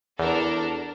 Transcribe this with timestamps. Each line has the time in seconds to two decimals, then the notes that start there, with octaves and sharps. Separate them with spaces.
0.19 E2 D4 A4 A#4